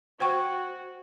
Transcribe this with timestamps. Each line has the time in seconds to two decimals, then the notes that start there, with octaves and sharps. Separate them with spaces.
0.20 F#4 C5 G5 C#6